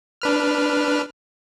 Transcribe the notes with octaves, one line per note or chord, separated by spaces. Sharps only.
D4 B4 F6